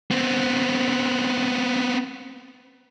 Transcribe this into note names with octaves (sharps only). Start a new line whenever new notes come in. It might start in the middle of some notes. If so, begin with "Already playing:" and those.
B3 C4